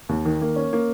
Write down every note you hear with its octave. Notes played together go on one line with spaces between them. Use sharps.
D#2
D#3
A#3
C#4
A#3